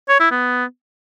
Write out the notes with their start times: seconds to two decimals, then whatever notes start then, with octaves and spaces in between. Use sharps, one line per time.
0.09 C#5
0.20 E4
0.31 B3